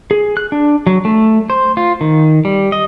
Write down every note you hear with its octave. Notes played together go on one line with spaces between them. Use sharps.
G#4
F#6
D4
F#3
A3
C5
F4
D#3
G3
D#5